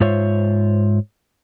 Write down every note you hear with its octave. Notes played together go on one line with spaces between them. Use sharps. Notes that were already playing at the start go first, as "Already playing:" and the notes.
G#2 F4 C5 C#5 E5